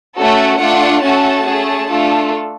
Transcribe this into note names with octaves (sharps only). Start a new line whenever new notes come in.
A3 C#4 F#4 A4
A3 D4 F4 F#5
A3 C#4 F#4 A4 A5
A3 C#4 G#4
A3 D4 F4 A4